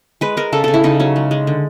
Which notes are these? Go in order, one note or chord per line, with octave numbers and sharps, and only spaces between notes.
G#3 B4
G#3 A#4
C#3 A4
C#3 A4
E4
C#3 D#4
F#3 C#4
G#3
G#3
D3